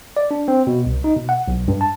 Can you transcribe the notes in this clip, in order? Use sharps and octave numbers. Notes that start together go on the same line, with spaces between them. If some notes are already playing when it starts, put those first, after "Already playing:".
D5
D4
C4
B2
C2
D#4
B2
F#5
B1
G2
A5